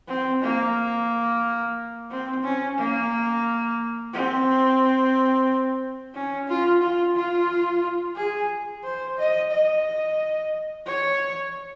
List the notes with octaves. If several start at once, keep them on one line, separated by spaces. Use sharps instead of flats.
C4
A#3
C4
C#4
A#3
C4
C#4
F4
F4
F4
G#4
C5
D#5
D#5
C#5